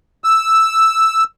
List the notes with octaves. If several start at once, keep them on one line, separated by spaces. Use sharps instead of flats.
E6